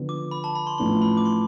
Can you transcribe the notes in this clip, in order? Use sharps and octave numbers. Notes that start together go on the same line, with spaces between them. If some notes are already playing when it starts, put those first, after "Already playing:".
Already playing: D3 F3 B3
D6
B5
A5
B5
C6
A1 A2 F3 B3 D4 C6
B5
D6
C6